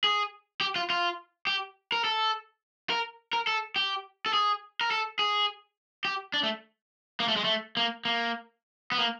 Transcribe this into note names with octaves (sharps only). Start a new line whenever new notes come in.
G#4
G4
F4
F4
G4
A#4
A4
A#4
A#4
A4
G4
A4
G#4
A#4
A4
G#4
G4
D4
A3
A#3
A3
G#3
A3
A#3
A#3
B3
A#3